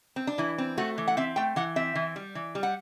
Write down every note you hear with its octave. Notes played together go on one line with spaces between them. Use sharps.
C4
D4
E3 E4
C4
A3 F#4
E3
F#5
C4 E5
A3 G5
E3 F#5
C4 E5
E3
G3
E3
G3
F#5